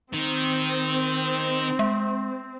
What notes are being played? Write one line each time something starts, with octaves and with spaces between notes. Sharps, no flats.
D#3 C4
G#3